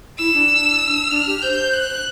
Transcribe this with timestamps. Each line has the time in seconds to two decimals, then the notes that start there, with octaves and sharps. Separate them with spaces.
0.19 E4 E6
0.34 D4
1.11 D4 F6
1.27 G4
1.42 C5 G6
1.73 F#6